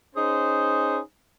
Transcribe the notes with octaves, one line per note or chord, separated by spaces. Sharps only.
C#4 D#4 G#4 C5